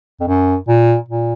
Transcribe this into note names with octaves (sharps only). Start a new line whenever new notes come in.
F2
F#2
A#2
A#2